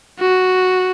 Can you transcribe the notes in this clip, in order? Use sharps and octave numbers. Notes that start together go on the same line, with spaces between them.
F#4